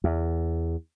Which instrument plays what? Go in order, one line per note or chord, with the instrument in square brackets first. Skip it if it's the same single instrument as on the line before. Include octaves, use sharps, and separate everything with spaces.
[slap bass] E2